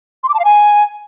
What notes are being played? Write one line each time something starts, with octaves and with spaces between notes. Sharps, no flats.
C6
D6
A5
F5
G#5